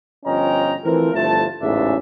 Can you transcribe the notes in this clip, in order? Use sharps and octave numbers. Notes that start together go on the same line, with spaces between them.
G1 F3 C#4 D#5 G5 A#5
E3 F3 A3 C4 A#4
G1 F3 A3 E4 A5
A1 E2 G#2 C#3 D4 E5